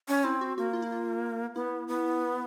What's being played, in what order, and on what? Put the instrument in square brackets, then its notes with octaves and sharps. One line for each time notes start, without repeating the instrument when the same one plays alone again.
[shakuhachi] C#4
[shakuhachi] C4 [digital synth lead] E4
[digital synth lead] F#4
[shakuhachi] A#3 [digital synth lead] F#4
[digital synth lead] F4
E4
F4
[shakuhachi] B3 [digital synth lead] E4
[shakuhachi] B3